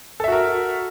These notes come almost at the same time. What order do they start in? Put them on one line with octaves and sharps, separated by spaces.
A4 E5 F#4 A#4